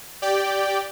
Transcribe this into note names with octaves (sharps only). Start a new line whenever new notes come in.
G4 D5 G5